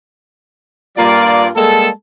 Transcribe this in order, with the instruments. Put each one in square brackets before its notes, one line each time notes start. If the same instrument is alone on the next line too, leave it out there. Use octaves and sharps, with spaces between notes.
[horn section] G2 G3 D5 [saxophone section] A#3 F4
[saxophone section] G3 G#3 A#3 [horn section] A4